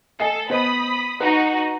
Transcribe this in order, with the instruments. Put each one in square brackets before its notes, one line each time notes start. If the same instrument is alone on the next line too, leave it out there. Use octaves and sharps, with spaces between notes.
[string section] A4 [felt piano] D#5 G#5 C7
[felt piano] B3 C5 D#5 [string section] B5 D#6
[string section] D#4 F#4 [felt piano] B4 F#5 A#5